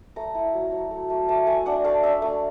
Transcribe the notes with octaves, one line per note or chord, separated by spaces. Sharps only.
A3 A#5
E4
F#3
F#3
A3
A3
A3 A5
A3 G#5
D4 F#5
A3 F5
D4 E5
A3 F5